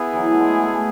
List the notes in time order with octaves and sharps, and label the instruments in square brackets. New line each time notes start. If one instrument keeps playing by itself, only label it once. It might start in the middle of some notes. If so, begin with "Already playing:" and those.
Already playing: [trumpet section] B3 E4 G#4
[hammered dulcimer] E3 F#3
A3
G#3
A3